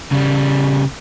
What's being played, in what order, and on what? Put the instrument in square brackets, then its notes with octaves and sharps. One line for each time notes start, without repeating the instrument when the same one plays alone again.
[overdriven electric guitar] C#3 G3